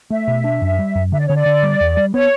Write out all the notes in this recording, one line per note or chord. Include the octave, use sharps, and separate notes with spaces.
A3 E5
B2
D4
F#2
G3
F#2
D3 E5
D5
C#5
D3
D5
D3
G3
E2
G3
B3 C#5